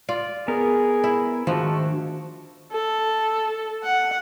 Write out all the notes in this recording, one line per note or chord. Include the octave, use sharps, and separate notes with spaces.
F4 D5
B3 G#4 A#4
E4
G#2 D#3 F3 A3 D4 F#4
A4
F#5